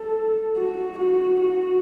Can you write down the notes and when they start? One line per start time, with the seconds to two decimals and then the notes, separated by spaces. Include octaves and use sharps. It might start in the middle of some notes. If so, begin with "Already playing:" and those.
Already playing: A4
0.57 F#4
0.98 F#4
1.41 F#4